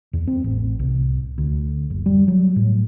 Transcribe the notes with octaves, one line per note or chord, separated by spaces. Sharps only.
E2
C4
A1
C2
D2
F#1
G3
F#3
A2